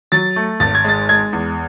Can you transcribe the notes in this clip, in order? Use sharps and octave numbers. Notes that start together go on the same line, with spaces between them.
F#3 A6
A3
G#1 A6
G#6
G#3 A6
G#3 G#6
E2